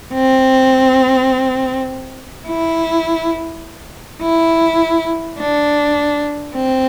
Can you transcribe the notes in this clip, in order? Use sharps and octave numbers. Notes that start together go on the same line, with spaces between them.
C4
E4
E4
D4
C4